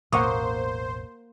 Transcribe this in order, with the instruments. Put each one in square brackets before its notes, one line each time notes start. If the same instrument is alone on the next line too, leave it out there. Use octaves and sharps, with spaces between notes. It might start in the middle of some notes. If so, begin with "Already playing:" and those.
[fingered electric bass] E1 A1 B2 [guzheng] A#3 [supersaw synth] C5 [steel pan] F#5 C#6 D#6